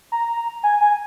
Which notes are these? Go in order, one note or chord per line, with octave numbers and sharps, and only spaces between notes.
A#5
G#5
G#5